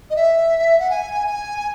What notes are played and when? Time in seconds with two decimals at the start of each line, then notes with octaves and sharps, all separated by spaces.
0.10 D#5
0.16 E5
0.79 F#5
0.90 G#5
1.27 G#5